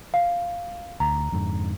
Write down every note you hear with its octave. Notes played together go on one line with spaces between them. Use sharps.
F5
D2 A#5
F2 G#2 D3